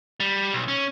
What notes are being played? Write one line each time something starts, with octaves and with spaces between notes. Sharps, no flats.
G3
B1
C#4